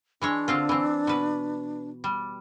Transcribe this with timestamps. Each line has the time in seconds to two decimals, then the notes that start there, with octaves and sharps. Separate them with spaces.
0.21 E3 G#3 D4 C#5
0.48 D3 C4 F4
0.69 E3 C4
1.07 B2 B4
2.04 G3